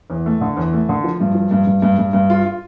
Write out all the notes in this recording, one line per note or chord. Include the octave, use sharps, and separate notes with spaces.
E2
A3
D3
E2
A3
D3
F3
G2
F3
G2
G2
G2
G2
G2
F4
F4